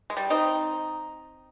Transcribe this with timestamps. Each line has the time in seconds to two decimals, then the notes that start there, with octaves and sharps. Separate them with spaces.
0.10 G#3
0.17 G3
0.30 C4 D#4